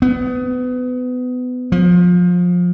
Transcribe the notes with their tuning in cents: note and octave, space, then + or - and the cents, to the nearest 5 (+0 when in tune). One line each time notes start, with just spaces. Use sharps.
B3 +25
F3 +25